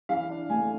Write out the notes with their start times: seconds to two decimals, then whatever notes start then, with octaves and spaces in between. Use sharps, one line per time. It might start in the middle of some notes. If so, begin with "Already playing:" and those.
0.09 E3 F5
0.29 D4
0.49 A3 G#5